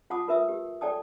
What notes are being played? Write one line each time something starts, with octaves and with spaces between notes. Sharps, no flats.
F4 F#5 A5 D6 D#6
F4 A#4 B4 E5 D#6 E6
G4
A4 D5 G5 A5 D#6